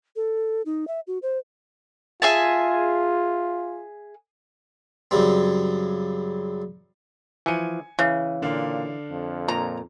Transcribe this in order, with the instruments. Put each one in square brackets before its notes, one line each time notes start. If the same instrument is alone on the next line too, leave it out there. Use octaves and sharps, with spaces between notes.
[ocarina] A4
D#4
E5
F#4
C5
[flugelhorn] F4 [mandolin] G#4 E5 A5
[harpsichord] F#2 C#3 G3 C4
[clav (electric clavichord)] E3 F3 [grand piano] G#5 C#7 D#7
[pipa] C#3 [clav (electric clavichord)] E3
[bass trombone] A#2 [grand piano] D3 D4 F5
[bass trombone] F2
[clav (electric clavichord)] A#2 [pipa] A#5